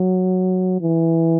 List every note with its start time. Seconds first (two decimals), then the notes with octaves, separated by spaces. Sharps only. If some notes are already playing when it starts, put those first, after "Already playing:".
Already playing: F#3
0.81 E3